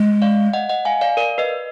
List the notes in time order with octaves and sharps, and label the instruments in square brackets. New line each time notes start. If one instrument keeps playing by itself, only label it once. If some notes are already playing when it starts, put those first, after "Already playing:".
Already playing: [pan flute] G#3
[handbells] D5 F5
D#5 F#5
D#5 F#5
F5 G#5
D5 F5
A#4 D5
B4 D#5